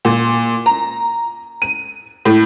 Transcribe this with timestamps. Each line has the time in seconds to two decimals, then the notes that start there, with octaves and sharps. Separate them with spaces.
0.05 A#2
0.66 A#5
1.62 D#7
2.25 A2